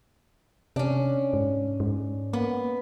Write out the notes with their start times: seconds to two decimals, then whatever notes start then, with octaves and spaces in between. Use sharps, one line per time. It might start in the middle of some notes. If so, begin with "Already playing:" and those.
0.76 C3 C#4 D4
1.33 G#2
1.80 G#2
2.33 A#3 B3